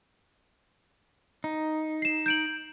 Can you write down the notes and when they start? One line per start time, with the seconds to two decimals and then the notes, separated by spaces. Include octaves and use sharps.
1.44 D#4
2.02 C7 E7
2.26 G6 D7 F#7